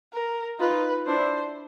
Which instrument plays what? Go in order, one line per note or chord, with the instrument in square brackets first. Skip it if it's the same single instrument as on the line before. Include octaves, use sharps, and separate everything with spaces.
[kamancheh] A#4
[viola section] D#4 F4 [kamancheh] B4
[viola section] D4 E4 [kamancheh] C5